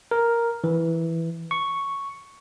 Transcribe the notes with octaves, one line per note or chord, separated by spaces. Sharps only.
A#4
E3
C#6